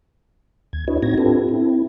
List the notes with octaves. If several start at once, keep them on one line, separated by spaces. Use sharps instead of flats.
D#2 G#6
D4 E4 F#4 B4 C#5 D#5
A2 C4 D#4 F#4 G#6 A#6
C4 D4 F4 G4 A4 B4
C4 E4